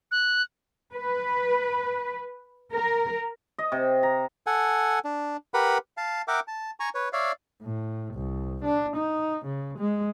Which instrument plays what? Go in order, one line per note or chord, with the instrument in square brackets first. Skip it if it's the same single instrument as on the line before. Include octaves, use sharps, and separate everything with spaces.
[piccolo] F#6
[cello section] B4
A#4
[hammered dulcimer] D#5
C3
A#5
[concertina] A4 F#5 G#5
D4
G4 A#4 B4 F#5 B5
F5 A5
A#4 E5 F#5 G5 D6
A5
G#5 A#5 C#6
B4 C#5
C#5 D5 E5 F5
[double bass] A2
C2
D4
D#4
C#3
G#3